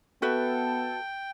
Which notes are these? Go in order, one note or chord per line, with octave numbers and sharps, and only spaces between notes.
B3 F#4 A4 B4 E5 G5